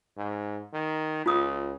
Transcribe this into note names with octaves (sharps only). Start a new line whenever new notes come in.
G#2
D#3
C#2 F4 D#6